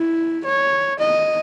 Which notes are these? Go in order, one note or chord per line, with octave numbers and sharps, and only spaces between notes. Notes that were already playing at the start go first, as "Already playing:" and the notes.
Already playing: E4
C#5
D#5